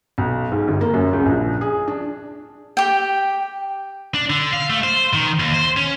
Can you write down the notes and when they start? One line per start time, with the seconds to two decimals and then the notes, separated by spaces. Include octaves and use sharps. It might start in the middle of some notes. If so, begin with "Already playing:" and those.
0.18 B1
0.51 G#2
0.68 G1
0.81 A#3
0.94 F#2
1.13 C#2
1.26 A#1
1.61 G#4
1.88 D4
2.77 G4 G5
4.14 D4
4.30 D3
4.53 F5
4.70 A3
4.84 C5
5.14 D#3
5.40 D#2
5.54 C5
5.77 C#4